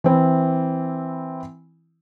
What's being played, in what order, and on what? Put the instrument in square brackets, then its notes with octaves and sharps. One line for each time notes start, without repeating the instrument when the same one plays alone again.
[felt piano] E3 C4 E4